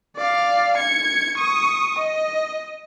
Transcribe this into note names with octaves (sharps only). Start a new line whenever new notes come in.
D5 F5
G#6 C#7
C#6 D#6
D#5